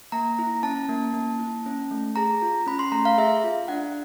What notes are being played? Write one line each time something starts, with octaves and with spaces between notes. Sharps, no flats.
A#3 A#5
E4
C#4 A5
A#3
A#3
E4
C#4
A3
G#4 A#5
F4
C#4 B5
C6
A3 A#5
F5
G#4 E5
F4
D4 F#5